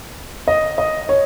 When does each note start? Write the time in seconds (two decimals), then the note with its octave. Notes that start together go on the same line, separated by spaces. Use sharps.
0.48 D#5
0.78 D#5
1.09 C#5